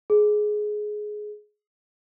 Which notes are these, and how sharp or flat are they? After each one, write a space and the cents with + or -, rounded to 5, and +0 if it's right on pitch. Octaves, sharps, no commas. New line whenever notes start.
G#4 +15